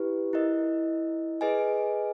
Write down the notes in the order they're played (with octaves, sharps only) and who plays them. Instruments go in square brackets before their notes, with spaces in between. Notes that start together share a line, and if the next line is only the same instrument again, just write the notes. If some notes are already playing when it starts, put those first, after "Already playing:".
Already playing: [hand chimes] E4 G4 B4
E4 A#4 D#5
G#4 B4 D#5 G#5